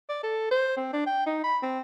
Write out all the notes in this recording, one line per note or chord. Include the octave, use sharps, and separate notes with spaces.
D5
A4
C5
C4
D4
G5
D#4
B5
C4